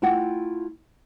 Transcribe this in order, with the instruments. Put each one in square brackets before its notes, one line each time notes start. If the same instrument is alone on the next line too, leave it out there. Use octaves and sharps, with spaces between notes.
[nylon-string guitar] A3 E4 F4 F#5 G5